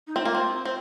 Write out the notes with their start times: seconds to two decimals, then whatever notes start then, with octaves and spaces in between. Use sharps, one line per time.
0.07 D#4
0.16 C4 F4
0.25 A#3
0.35 C4
0.65 C4